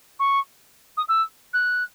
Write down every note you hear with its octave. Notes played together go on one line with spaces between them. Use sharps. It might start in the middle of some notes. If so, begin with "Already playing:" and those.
C#6
D#6
E6
F#6